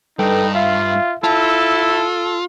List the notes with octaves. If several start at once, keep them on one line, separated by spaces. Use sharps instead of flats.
G2 D#4 A4 B4 G5
F4 E5 F5
E4 F4 A4 A5